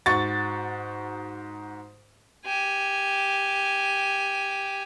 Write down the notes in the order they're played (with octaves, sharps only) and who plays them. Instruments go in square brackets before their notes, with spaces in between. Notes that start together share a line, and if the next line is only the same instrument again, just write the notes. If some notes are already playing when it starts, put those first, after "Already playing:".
[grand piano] G#2 F#4 C#6 A6
[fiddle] G4 G#5